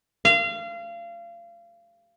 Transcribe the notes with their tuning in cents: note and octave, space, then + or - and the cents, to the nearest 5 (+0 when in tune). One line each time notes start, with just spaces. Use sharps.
F5 -30